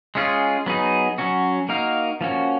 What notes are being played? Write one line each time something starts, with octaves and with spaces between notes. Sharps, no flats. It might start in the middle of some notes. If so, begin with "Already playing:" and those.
G#3 C#4 F4 G#4
F#3 B3 D#4 G#4
F#3 C#4 F#4
A#3 D#4 F#4 A#4 F5
F3 A#3 C#4 F#4